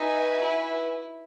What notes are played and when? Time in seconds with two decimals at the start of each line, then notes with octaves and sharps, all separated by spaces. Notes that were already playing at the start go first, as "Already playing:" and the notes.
Already playing: D#4 F#4 B4 E5 G#5
0.42 E4